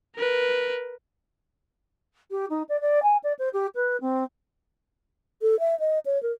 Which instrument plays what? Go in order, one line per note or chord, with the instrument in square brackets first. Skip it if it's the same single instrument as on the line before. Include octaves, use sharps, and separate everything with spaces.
[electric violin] A#4 B4
[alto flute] G4
D#4
D5
D5
G#5
D5
C5
G4
B4
C4
A4
E5
D#5
C#5
A#4